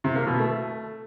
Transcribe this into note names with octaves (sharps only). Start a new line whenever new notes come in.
C3
A#3
B2
A3